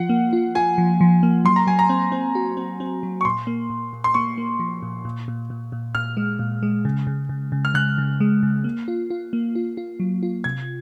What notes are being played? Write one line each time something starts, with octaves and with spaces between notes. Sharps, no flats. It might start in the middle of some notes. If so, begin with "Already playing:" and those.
Already playing: F3 F4 F#5
A#3
F4
F4 G#5
F3
F3
A#3
F#3 C6
A#5
F#3 G#5
A#5
C4
C4
F#4
C4
C4
F#3
C#6
A#2 C6
A#3
A#2
A#2
C6
A#3 C#6
A#3
F3
A#2
A#2
A#2
A#2
A#2
A#2 F6
G#3
A#2
G#3
C#3
C#3
C#3
C#3
F6
C#3 F#6
C#3
G#3
C#3
A#3
F4
F4
A#3
F4
F4
F#3
F4
C3 G#6